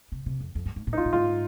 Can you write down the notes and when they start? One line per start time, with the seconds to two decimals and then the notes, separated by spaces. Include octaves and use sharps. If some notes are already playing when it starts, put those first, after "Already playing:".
0.12 C3
0.26 C3
0.40 F2
0.55 F2
0.65 G2
0.76 G#2
0.87 A#2
0.93 D#4
0.97 G#2 F4
1.05 A#2
1.13 G#2 F4